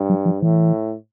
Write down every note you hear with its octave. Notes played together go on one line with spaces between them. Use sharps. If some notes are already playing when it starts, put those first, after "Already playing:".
Already playing: G2
F#3
F3
A2 E3